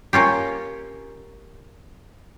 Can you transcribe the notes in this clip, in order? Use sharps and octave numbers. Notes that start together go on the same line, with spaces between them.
A#3 C#4 F4 G4